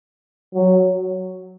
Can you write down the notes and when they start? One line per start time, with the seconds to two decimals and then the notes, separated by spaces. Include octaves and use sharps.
0.54 F#3